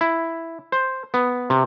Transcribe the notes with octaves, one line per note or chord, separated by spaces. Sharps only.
E4
C5
B3
C3